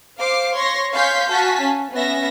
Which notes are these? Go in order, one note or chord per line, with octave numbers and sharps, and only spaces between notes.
C5 F5 D6 C7
C#5 C6 A#6
C#5 F5 G#5 C6 G6 B6
F#4 F5 G#5 A5 B6
C#4
B3 C#4 E5 A#6